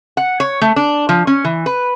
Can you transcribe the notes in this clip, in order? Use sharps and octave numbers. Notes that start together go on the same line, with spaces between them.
F#5
C#5
A3
D4
F3
C#4
E3
B4